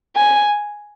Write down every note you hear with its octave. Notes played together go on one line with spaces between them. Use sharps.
G#5